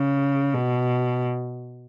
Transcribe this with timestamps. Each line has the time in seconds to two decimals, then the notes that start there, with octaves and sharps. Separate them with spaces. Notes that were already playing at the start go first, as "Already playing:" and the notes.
Already playing: C#3
0.54 B2